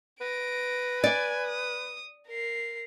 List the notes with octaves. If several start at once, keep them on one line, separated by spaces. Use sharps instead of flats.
B4 A#6 D7
D5 G#5
D#6
A#4 C7